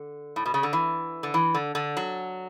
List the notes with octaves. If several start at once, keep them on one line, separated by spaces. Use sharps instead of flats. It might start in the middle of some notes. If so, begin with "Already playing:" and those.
Already playing: D3
A2
B2
C#3
D3
E3
D3
E3
D3
D3
F#3